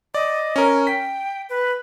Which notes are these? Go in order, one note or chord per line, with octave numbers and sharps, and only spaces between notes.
D5 D#5
C#4 A#4
G5 B6
B4